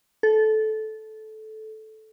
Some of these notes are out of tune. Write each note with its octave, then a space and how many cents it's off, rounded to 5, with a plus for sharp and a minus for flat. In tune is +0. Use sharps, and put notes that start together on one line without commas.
A4 -15